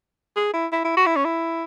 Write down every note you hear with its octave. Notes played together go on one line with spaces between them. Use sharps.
G#4
E4
E4
E4
F#4
E4
C#4
E4